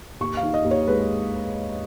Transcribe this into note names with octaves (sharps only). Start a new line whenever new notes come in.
D#2 C#6
F5
D#3
D#5
D#2
C#5
G#3 B4